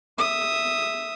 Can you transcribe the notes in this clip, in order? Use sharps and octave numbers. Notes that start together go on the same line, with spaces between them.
E5 D#6